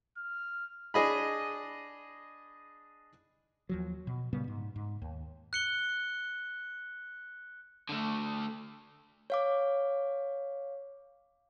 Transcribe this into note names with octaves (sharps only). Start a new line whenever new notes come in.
F6
D4 G#4 D#5 B5
D#2 F3 F#3
B2
A#2 C#3 G3 B3
G#2
G#2
D#2
F#6 C#7 G7
D3 A3
C#5 F5 D6